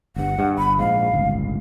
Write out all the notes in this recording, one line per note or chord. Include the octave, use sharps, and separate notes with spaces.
G1 G2 F#5
G2
G1 B5
A#1 G#2 F5
D1 G1 C#2